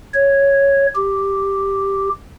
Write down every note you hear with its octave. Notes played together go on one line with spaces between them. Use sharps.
C#5
G4